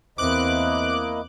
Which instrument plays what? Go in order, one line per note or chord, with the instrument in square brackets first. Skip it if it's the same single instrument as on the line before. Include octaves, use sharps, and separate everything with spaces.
[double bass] E2 C4 [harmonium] A#3 E4 D#5 [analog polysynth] D6 F#6